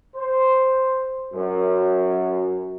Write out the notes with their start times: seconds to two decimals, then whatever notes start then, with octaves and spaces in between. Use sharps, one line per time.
0.15 C5
1.33 F#2